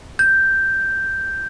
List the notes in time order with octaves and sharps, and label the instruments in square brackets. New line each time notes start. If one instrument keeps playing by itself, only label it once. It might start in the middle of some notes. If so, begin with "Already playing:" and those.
[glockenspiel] G6